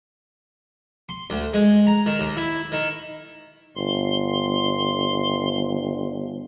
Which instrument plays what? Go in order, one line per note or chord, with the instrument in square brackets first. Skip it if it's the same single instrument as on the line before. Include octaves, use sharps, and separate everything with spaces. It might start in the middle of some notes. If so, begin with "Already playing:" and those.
[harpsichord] C6
D2
G#3
A#5
D#3
D#2
E4
D#3
[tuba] G1 [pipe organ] C6